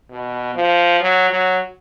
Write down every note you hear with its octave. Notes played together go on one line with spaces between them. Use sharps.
B2
F3
F#3
F#3